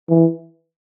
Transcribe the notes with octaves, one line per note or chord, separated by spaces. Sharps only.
E3